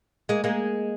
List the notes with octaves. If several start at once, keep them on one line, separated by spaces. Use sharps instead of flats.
G#3 A#3
G#3 A#3